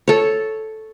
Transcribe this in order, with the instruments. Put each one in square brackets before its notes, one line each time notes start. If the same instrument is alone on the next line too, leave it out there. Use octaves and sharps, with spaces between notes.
[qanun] A4 C#5